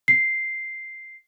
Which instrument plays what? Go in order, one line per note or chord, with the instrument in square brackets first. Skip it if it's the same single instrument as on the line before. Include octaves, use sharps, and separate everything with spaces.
[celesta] C7